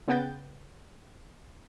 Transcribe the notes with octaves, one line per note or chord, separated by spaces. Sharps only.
C#3 B3 F#5 G5 G6 A6